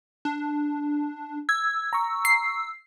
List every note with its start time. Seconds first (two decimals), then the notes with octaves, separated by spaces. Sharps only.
0.25 D4
1.49 E6 G#6
1.93 A#5 C#6
2.25 C7